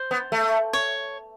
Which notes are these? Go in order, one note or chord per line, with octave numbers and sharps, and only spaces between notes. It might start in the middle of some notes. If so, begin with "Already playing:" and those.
Already playing: C5
B3
A3
C#5